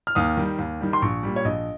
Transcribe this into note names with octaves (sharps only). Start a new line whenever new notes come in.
F6
D#2 D#6
D#3 G3
D#2
D#3 G3
C6
A#1 C#6
A#2 G3
C#5
A#1 D#5